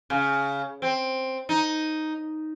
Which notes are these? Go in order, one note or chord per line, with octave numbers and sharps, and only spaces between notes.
C#3
C4
D#4